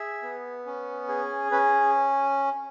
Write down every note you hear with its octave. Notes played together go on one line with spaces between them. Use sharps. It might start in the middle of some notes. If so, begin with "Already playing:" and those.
Already playing: G#4 E5
B3
C#4
G#4
C#4 B4